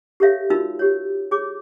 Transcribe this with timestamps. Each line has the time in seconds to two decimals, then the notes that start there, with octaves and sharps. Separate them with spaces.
0.20 G4 A4 A#4 C#5 E5 F5
0.50 D#4 F4 F#4 A#4 B5 E6
0.79 G4 C#5
1.31 G#4 C#5 D6